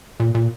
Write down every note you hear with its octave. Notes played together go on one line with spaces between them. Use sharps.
A#2
A#2